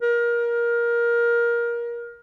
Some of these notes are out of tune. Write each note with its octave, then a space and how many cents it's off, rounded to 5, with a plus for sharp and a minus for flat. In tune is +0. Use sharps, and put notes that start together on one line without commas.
A#4 +20